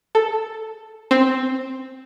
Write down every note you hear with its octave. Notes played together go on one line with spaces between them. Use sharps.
A4
C4